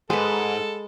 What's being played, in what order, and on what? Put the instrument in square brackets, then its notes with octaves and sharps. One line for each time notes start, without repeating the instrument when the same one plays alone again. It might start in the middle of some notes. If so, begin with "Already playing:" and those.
[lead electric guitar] G#2 [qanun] G#3 B4 [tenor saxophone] A4